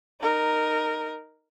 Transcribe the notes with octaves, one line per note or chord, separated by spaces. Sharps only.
D#4 A#4